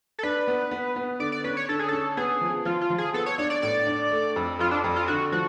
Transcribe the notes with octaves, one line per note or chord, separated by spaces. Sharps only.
A4
D4 B4
B3
B3
B3
D3 D5
D5
C#4 B4
C#5
D3 A4
G#4
C#4 A4
B3 G#4
F3
F3 F4
F4
F3
G#4
B3 A4
C#5
D4 C#5
D5
A2 D5
D4
A3
F2
F2 F4
D4
F2
F4
D3 F#4
F3 F#4